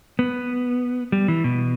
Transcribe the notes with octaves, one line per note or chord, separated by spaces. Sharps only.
B3
G3
E3
B2